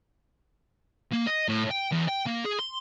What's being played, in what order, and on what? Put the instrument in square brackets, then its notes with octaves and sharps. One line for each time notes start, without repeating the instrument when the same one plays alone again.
[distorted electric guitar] A#3
D#5
A2
G5
E2
G5
A#3
G#4
C6